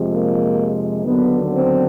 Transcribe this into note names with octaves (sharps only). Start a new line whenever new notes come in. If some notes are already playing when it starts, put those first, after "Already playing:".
Already playing: F2 C3 F3 G#3
A#3
D#2 D3 F#3 B3
C4